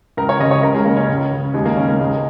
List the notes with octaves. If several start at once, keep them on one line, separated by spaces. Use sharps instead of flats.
C#2 A#4
C#5
C#3 D#5
C#5
C#2 A#4
G#3
C#3 A#3
C#4
C#2
C#3
D#2 G#3
A#3
C#3 C#4
A#3
C#2 G#3